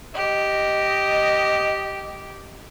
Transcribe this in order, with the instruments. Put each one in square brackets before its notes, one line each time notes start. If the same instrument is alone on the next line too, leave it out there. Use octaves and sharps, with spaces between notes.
[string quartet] G4 [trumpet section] D#5